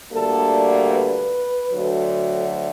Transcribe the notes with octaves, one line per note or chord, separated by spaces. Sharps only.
D2 D3 G3 A#3 A4
B4
D2 D3 F#3